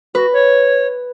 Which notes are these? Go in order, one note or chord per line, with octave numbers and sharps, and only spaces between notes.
F#4 B4
C#5